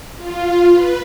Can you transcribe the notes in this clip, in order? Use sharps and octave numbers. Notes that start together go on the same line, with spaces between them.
F4
B4